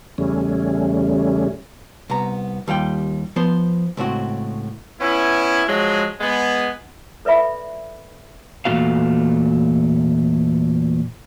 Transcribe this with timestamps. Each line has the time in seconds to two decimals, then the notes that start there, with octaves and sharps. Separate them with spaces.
0.18 E2 C#3 G3 A3 C#4
2.10 C2 B3 A#5
2.68 D#2 G3 F4 G5
3.36 F3 B3 C5
3.97 C#2 A2 C4 F#4
5.00 B3 C#4 E4
5.67 F3 F#3 G#3 G#4
6.20 G#3 B3
7.25 A4 B4 D5 E5 B5
8.65 E2 A#2 A3 C#4 F#4 F5